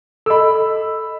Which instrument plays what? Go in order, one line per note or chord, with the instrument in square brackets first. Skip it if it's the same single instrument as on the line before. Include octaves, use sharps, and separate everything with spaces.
[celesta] A4 D#5 [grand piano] B5 E6